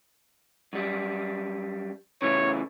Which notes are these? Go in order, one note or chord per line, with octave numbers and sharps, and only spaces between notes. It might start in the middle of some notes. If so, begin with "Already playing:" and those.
F#2 G3
C#3 E3 A3 C#5